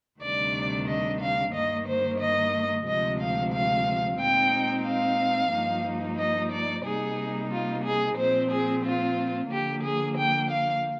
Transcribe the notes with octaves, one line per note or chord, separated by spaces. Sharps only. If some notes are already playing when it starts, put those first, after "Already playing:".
D2 C3 D#3 G3 D4 D5
D#5
F5
G2 D#3 A#3 D#5
C5
D#5
D2 C3 F3 G#3 D#5
F5
F5
A#2 G#3 C4 D#4 G5
F5
G2 F3 A#3 D#4
D#5
D5
C3 G3 A#3 D#4 G#4
F4
G#4
A#2 F3 C4 C5
G#4
F4
D3 F3 A#3 G4
G#4
G5
F5